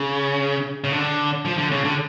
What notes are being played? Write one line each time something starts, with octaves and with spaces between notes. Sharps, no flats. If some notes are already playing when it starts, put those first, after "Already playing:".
Already playing: C#3
C#3
D3
F3
D3
C#3
D3